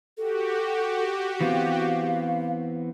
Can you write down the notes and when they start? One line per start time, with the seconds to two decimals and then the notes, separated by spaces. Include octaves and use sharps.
0.17 F#4 G4 A4
1.41 E3 B3 C4 F5